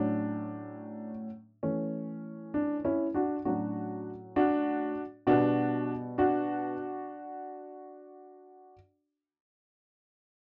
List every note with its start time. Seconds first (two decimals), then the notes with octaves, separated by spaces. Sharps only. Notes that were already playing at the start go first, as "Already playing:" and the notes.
Already playing: A2 F#3 C#4 D4
1.63 E3 A3 C#4
2.54 D4
2.85 C#4 E4
3.14 D4 F#4
3.45 A2 F#3 C#4 D4 F#4
4.36 D4 F#4
5.27 B2 G3 B3 D4 F#4
6.18 D4 F#4